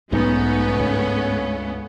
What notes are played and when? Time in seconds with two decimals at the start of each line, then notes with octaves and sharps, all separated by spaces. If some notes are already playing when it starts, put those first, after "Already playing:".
0.13 B1 G#2 A3 B3 C#4 D#4
0.79 C#2 G2 C#3 C#5